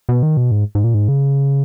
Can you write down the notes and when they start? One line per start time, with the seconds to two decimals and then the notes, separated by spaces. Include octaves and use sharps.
0.09 B2
0.23 D#3
0.37 B2
0.51 G#2
0.75 G#2
0.84 A#2
0.94 G#2
1.08 C#3